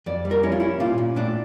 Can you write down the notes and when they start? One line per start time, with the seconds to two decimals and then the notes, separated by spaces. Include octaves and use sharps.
0.06 F2 D5
0.25 G3
0.31 A#4
0.43 C#4 E4
0.52 F4
0.60 C#4 E4
0.80 A#2 F4
0.98 A#2
1.16 A2 D4